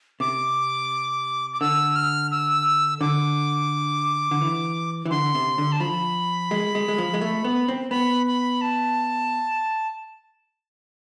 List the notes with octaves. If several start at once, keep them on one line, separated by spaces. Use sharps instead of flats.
C3 D6
D6
D3 E6
F6
E6
D3 D6
D3
E3
E3
D3 C6
C3
D3
A5
F3 B5
G#3
G#3
G#3
F3
G#3
A3
B3
C4
B3 B5
B5
A5